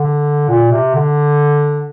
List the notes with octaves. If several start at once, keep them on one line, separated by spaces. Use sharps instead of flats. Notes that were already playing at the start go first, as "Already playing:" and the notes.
Already playing: D3
A#2
C3
D3